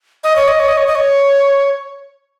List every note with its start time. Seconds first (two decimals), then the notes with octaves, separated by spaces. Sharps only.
0.24 D#5
0.36 C#5
0.48 D#5
0.60 C#5
0.68 D#5
0.77 C#5
0.87 D#5
0.95 C#5